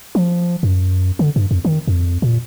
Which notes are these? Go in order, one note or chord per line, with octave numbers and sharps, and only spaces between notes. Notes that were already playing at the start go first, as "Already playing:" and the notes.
F3
F#2
D3
G2
F2
D#3
F2
A#2